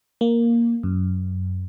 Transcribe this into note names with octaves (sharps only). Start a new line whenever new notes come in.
A#3
F#2